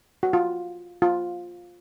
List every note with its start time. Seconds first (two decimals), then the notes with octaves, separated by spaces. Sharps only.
0.23 F#4
0.33 F4
1.02 F4